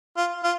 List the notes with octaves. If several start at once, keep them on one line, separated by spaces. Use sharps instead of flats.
F4
F4